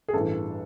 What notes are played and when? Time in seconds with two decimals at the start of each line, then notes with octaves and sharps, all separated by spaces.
0.08 G#4
0.13 A1 G2 E3 A4